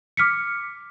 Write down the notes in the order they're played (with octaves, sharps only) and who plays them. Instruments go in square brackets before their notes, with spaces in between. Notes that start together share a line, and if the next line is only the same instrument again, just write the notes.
[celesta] D6 F6 B6 C#7